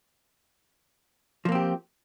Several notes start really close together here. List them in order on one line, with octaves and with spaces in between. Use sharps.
F3 A#3 C4 G4